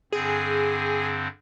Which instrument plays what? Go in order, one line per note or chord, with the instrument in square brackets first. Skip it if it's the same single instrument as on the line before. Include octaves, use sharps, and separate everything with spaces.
[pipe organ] G2 D3 C4 [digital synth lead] G#4